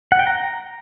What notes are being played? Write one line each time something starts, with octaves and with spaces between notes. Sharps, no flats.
F#5
G5
A#5